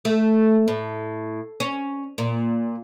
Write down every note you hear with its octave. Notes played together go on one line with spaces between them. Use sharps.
A3
A2
C#4
A#2